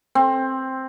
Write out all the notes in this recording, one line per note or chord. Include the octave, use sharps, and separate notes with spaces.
C4